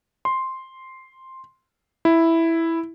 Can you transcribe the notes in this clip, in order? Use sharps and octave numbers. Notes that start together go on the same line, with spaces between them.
C6
E4